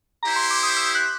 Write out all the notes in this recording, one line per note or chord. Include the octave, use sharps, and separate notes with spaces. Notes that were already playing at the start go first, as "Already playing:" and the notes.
E4 G4 C5 A#5
C6
D6
D#6
E6
F#6